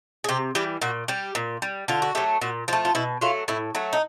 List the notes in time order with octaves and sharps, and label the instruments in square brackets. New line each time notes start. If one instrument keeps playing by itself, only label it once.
[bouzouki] G#4
C3 G4
E3 G3 G4
A#2 F#4
G3 G4
A#2
G3
D3 F4
F#4
F#3 A3 G4
A#2 F#4
F3 F4
A3
F4
B2 E4
F#3 A3 F4
A2 E4
F#3 A3
D#4